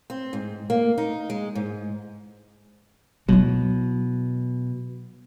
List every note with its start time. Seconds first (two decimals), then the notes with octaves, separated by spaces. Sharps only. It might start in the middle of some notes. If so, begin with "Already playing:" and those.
0.10 C4
0.33 G#2
0.70 A#3
0.98 D#4
1.30 G#3
1.55 G#2
3.28 B2 F#3 E4